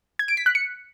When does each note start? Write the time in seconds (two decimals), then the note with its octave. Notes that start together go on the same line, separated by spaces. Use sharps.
0.19 G#6
0.28 D7
0.37 B6
0.46 F#6
0.55 C#7